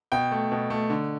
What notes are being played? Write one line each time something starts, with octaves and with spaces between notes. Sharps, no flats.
B2 G5
A3
B2
A3
D3